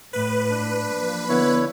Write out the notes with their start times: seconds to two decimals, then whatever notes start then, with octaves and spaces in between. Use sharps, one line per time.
0.13 A2 B4
0.50 D4
0.91 F3 A#3
1.29 D3 B3 E4 C#5